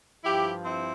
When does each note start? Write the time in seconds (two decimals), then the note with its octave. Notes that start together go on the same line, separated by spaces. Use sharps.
0.24 G2 F3 E4 G4
0.64 C4 E4